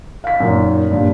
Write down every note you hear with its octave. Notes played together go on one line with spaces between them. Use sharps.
F5 B6
F#2 A#2 D#3
G2 A#2